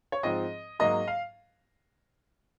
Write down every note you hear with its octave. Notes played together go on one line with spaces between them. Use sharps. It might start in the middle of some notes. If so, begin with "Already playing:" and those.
C#5
G#2 F3 C4 D#5
G#2 F#3 A#3 D#5
F5